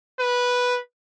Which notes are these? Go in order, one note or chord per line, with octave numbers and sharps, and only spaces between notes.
B4